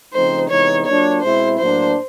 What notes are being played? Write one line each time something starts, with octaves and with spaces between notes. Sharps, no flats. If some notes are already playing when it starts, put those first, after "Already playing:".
C#3 F3 A3 C4 D#4 C5
C3 E3 G#3 B3 D#4 C#5
F#3 A#3 D4 F4 C#5
B2 G#3 C4 E4 C5
A2 F#3 A#3 D4 C5